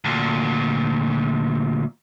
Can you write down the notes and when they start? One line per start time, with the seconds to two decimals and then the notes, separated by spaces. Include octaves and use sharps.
0.04 D2 A#2